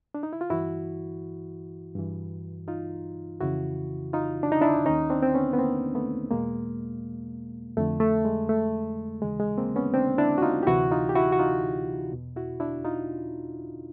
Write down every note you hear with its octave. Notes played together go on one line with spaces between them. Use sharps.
D4
D#4
E4
F4
G2 E3 E4 F#4
G2 E3
D#4 F4
F2 C#3 E3 E4 F#4
D#4 F4
D4
D#4
D4 E4
D#2 D#3 C#4 D#4
C4 D4
C4
B3 C#4
B3
A#3 C4
A3 B3
E2 B2 G#3 A#3
F2 D3 A3
A3
G#3
A3
D#2 C#3 E3 G#3
G#3
A#3 C4
B3 C#4
C4 D4
D4 E4
F#4
D#4 F4
G4
D2 C3 E3 E4 F#4
D#4 F4
G4
E4 F#4
F#4
D#4 F4
E2 B2
E4 F#4
D4 E4
D#4 F4